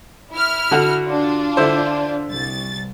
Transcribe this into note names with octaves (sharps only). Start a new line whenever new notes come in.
E4 F6
D3 F#4
D4 F4
D3 E4 C5
C2 A6